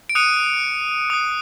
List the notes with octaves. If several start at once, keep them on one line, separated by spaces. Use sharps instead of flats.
D7
D#6 F#6 C#7 D#7
D#6 F#6